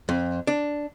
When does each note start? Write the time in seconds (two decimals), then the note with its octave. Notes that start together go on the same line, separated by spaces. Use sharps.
0.09 F2
0.47 D4